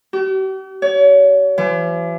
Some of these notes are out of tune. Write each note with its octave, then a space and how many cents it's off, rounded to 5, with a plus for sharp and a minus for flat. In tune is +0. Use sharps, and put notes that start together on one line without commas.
G4 -45
C#5 +35
E3 +45